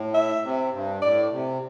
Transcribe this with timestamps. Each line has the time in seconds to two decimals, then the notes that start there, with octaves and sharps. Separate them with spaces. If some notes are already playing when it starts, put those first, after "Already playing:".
Already playing: A2
0.14 E5
0.43 C3
0.73 G2
1.02 A2 D5
1.32 C3